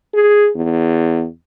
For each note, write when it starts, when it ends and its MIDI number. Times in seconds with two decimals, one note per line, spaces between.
0.14 0.50 68
0.56 1.26 40